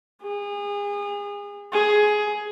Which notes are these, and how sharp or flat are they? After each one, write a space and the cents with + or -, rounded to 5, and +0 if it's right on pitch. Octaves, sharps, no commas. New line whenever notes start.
G#4 -30
G#4 +15